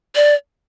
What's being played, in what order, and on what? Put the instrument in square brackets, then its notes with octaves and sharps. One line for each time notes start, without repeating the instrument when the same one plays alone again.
[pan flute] D5